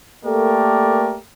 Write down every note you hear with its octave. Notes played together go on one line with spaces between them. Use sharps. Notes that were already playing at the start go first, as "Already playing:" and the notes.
A3 A#3 G4 A4 A#4 D5